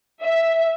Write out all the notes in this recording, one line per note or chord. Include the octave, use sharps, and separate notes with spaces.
E5